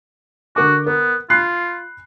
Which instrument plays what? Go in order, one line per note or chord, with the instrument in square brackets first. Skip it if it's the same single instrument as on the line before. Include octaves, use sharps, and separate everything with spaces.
[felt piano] D3 A#4 D6 [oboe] F#4
[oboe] B3 [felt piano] A#4
[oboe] F4 [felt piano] B5 F#6 C7